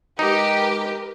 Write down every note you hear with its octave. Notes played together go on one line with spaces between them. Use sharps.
G#3 D#4 G4 A#4 B4